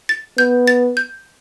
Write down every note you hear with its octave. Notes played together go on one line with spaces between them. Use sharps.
A6
B3 G6
A6
G6